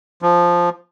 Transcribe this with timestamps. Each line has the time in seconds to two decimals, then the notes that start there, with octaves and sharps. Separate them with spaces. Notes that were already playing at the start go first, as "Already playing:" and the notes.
0.22 F3